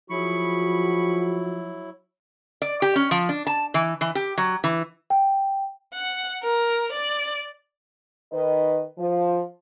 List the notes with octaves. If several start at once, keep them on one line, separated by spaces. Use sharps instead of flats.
F3 F#3 E4 F#4 G#4 B5 C#6
D5
G4
C#4
F3
D4
A5
E3
E3
G4
F#3
E3
G5
F#5
A#4
D5
D#3 B4 D#5
F3